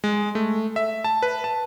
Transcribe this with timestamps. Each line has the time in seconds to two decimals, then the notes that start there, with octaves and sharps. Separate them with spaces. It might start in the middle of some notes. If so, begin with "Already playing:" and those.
0.04 G#3
0.35 A3
0.76 E5
1.04 A5
1.23 B4
1.44 A5